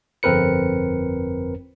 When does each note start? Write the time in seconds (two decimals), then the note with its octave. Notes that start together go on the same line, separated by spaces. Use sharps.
0.23 G1 F2 C4 A#4 B4 C#7